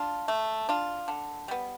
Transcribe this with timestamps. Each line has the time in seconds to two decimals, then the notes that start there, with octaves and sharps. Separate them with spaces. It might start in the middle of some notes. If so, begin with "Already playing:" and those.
Already playing: D4 F4
0.28 A3
0.69 D4 F4
1.08 D3
1.48 G3 B3